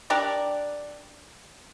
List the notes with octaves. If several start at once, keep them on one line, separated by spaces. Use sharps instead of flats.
D4 G4 A#4 D5